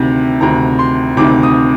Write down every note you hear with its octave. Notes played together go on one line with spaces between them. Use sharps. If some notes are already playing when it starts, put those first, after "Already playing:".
Already playing: D2 C3 D#3
D2 C3 D#3 A#5
C6
D2 C3 D#3 D6
D#6